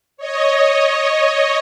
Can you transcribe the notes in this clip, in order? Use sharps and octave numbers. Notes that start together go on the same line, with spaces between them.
C#5 D#5